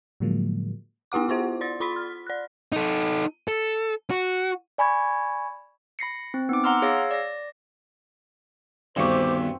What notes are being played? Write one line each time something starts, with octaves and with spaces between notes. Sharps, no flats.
A2 D3 F3 F#3 G#3 A#3
B3 E4 G4 F#5 D6
E4 F4 C5 F#5
D5 C6 A6
F4 B5 C6 B6
F6
D5 F#6
D#4 A4
A4
F#4
D5 G#5 B5 C#6 G#6
B5 A#6 C7 C#7
C4
B3 D#4 D6
F#5 A#5 C6 E6 F6
G#4 C#5 F5 E6 A#6
D5 A#6
D2 G2 D#3 B3 C4 C5 C#6 D6